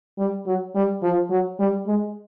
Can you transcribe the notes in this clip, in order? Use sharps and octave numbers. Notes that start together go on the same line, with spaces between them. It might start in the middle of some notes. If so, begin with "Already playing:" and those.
G3
F#3
G3
F3
F#3
G3
G#3